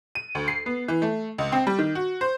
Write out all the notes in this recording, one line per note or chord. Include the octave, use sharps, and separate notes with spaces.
D#7
D2
C7
B3
E3
A3
C#2
C4
G3
D#3
F#4
C5